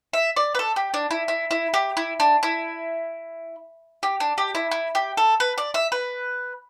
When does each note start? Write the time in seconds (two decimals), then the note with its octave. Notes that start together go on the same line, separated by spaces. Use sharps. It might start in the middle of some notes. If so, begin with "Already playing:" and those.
0.13 E5
0.36 D5
0.55 B4
0.59 A4
0.76 G4
0.94 D4
1.11 E4
1.28 E4
1.51 E4
1.74 G4
1.97 E4
2.20 D4
2.43 E4
4.03 G4
4.20 D4
4.38 G4
4.55 E4
4.71 E4
4.95 G4
5.17 A4
5.40 B4
5.58 D5
5.74 E5
5.92 B4